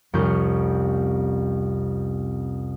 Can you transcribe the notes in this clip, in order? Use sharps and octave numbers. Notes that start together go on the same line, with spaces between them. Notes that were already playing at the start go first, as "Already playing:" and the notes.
C2 F2 C#4 C#6 F6 G6